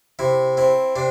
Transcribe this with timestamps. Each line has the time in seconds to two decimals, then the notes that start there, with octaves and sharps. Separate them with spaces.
0.19 C3 E4
0.57 C4 E4
0.96 C3 D4